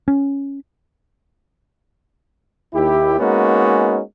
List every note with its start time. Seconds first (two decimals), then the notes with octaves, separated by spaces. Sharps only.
0.08 C#4
2.74 D#2 E4 G4
3.18 G#3 A#3 B3 C#4 D#4 F#4